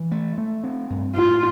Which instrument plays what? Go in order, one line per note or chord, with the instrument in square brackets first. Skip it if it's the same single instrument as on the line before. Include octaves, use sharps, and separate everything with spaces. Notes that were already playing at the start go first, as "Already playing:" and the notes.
Already playing: [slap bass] E3
A3
A3
C4
G2
[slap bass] A2 [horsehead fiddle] F4